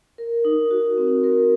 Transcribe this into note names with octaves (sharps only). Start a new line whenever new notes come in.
A#4
D#4
F#4
C4
A#4